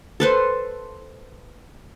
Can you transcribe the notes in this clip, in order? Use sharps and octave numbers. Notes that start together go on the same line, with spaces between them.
A4 B4 C5